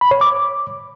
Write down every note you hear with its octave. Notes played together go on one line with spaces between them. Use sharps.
B5
C#5
D6